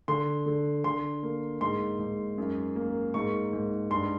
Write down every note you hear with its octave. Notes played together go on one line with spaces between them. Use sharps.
D3 C6
D3
D3 C6
A#3
G#2 C6
G#2
F#2
A#3
G#2 C#6
G#2
G2 C6